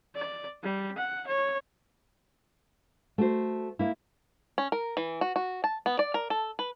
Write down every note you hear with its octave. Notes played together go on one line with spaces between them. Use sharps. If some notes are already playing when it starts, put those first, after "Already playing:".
D5
G3
F#5
C#5
A3 F#4 C5
A#3 E4
C#4
A#4
E3
F#4
F#4
A5
B3
D5
A#4
A4
B4